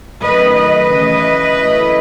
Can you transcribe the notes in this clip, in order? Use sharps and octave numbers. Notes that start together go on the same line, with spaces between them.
F#2 D#3 A3 B4 D#5
B4 D#5
C#3 E3 A3
F#2 E3 A3 E4